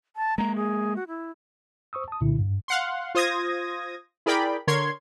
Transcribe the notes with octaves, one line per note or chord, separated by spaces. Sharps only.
A5
G#3 A#3 A#5
G#4
F#4
E4
C5 C#6 D#6 E6
A5 D#6
C2 A#2 D3 E4
G2
F5 F#5 C6
F4 C5 D#6 G#6 A#6
E4 G#4 A#4 D5 G5 B5
D3 A#4 C#5 C6 G#6